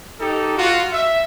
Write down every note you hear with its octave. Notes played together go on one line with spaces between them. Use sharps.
D#4 G4 A4
F4 F#4
E5